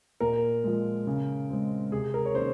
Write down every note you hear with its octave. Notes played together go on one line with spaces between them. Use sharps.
A#2 A#4
F3 G#3
C#3
G#3 C4
C3 G#4
A#4
C#5
D#3 A#3 C#4 C5